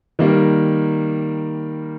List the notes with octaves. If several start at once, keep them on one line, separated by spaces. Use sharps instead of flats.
D#3 G3 A#3